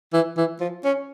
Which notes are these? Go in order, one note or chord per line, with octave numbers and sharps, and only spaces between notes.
E3
E3
F3
C#4